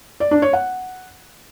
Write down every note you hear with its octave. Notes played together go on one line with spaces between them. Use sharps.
D5
D4
C#5
F#5